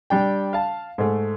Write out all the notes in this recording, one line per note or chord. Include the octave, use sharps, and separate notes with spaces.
G3 D4 G5
F5 A5
G#2 A3